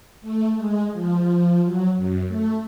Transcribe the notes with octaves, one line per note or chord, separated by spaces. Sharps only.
A3
G#3
F3
F#3
F#2
A3